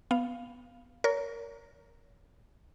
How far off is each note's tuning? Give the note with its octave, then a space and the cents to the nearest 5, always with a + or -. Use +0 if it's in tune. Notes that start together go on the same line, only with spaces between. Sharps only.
B3 +0 F5 +0
A#4 -5 C#5 +35